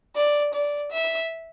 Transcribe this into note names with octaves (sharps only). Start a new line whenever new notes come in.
D5
D5
E5